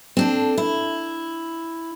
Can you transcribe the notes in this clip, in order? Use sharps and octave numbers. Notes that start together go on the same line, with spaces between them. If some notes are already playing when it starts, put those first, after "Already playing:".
C4 D4 A4
E4